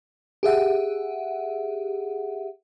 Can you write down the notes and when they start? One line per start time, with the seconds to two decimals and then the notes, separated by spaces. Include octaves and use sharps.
0.43 G4 G#4 E5 F#5